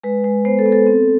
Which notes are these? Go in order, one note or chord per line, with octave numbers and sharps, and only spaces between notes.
G#3 B4
G#3
B3 C5
A4
B3
A4
C4